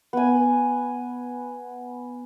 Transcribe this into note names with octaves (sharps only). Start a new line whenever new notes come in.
B3 G#5